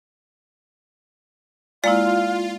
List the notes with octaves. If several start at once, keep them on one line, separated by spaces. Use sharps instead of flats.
G#3 A#3 E4 F4 D5 F5